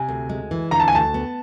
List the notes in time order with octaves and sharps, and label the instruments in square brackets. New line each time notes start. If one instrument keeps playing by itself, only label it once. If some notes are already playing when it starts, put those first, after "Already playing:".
Already playing: [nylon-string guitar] C3 [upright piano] G#5
[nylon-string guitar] D2
G#3
E3
[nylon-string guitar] D3 [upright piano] A#5
[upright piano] A5
G#5
[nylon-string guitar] D2 [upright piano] A5
[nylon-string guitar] B3